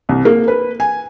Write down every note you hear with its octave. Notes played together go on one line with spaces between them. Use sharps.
C2
A#3
B4
G#5